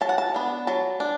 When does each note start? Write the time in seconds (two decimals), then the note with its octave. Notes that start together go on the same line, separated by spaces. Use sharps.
0.01 F#3 A5
0.09 F#5
0.18 A5
0.34 B3 D4
0.67 F#3 A5
1.00 D4